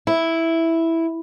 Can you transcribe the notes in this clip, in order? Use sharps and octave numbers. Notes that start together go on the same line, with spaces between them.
E4